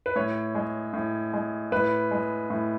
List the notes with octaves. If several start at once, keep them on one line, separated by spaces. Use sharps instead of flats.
B4
A2 C#5
G#3
A2
G#3
A2 B4
G#3
A2